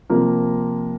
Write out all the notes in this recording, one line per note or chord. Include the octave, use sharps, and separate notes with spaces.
C3 F3 A#3 F4 A#4